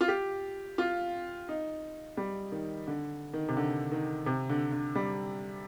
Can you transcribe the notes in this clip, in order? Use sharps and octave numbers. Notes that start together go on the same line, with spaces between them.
F4
G4
F4
D#4
G3
D#3
D3
D#3
C3
D3
D#3
C3
D3
D3
G3